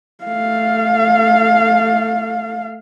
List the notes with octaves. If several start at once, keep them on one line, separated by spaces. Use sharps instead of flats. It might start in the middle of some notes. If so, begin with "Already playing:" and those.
A3 F5